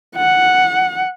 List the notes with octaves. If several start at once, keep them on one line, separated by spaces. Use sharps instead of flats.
F#5